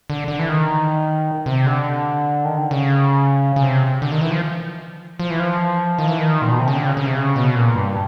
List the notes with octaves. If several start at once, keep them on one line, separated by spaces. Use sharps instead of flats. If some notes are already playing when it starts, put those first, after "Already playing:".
D3
D3
E3
D#3
C3
D3
D#3
D3
C#3
C#3
C3
D3
D#3
E3
F3
F3
E3
F3
D#3
E3
D#3
A#2
B2
C3
C#3
D3
C#3
C#3
C3
C#3
B2
A#2
G2